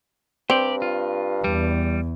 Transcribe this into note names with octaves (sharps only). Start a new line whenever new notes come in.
G2 C4 G4 D5
F4
E2 G3